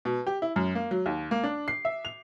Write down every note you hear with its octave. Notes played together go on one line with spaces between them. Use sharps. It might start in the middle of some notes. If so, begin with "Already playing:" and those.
B2
G4
E4
F#2
A#3
F#3
D#2
A#3
D4
C7
E5
F7